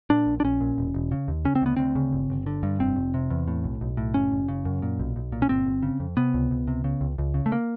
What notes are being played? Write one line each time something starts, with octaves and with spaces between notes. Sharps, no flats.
A#2 D4
A#1
D4
A#1 C#4
A#2
E1
E1
C#3
D#2
C#3 C#4
C4
D2 B3
D2 C4
C#3
G1
G1
D3
G2
F1 C4
F1
C3
E2
A2
B1
B1
A2
F#1 C#4
F#1
C#3
F#2
A#2
B1
B1
A#2
C#4
G1 C4
G1
C#3
F2
C3 B3
C#2
C#2
C3
C#3
C#2
C#2
C#3
A3
A#3